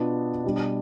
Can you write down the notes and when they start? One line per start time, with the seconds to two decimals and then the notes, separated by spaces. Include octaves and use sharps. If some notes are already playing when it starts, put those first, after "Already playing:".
Already playing: B2 B3 D4 F4
0.44 B2 G3 D4